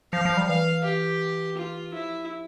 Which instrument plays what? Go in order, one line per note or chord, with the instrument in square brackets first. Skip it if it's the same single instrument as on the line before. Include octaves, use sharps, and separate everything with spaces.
[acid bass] F3 [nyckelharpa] F5
[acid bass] F3
G3
[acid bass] E3 [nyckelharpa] F5
[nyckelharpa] G4
F4
[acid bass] F3 [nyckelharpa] E4